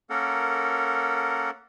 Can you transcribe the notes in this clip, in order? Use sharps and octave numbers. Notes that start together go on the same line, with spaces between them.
A#3 C#4 A4 A#4 F#5